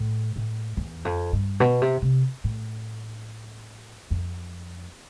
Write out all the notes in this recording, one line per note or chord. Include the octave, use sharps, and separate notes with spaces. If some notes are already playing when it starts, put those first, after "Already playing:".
Already playing: A2
A2
E2
F2
G2
B2
C3
C3
A2
F2